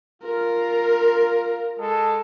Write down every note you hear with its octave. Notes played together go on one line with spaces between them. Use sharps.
F4 A#4
G#3 A4